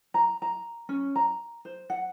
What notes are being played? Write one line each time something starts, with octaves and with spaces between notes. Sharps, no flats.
A#5
A#5
C#4
A#5
C5
F#5